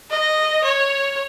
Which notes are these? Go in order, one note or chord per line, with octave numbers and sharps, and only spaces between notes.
D#5
C#5